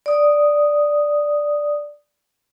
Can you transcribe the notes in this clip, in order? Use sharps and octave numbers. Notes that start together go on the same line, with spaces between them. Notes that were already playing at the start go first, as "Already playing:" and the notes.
D5 D#6